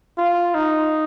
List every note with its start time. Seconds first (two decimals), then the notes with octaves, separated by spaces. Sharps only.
0.18 F4
0.54 D#4